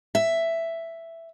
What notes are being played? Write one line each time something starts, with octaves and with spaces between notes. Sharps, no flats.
E5